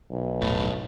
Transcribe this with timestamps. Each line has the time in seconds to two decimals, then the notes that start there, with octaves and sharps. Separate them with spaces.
0.11 B1
0.41 D#1 A2